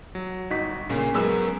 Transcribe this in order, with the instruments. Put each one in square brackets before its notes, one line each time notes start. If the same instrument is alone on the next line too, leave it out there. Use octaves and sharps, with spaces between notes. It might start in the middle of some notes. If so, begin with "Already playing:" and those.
[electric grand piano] F#3
[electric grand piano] G1 B6 [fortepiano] D#4 F#4
[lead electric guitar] A#2 [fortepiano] C#3
[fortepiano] F#2 G#3 E6 [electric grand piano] B3 G#4 B4 [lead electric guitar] C#4 A#4